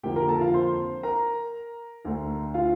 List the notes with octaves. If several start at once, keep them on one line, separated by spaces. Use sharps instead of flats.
F2 D3 F3 A#3 G4 G5
A#4 A#5
A4 A5
F4 F5
C5 C6
A#4 A#5
D2 D3 A3
F4 F5